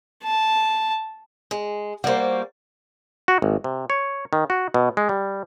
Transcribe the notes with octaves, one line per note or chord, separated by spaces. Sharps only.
A5
G#3
G3 A#3 F#4 G#4 C5
F#4
G#1
C3
C#5
D#3
F#4
B2
G#3
G3